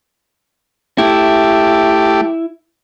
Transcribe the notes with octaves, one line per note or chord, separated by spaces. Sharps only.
A3 E4 G4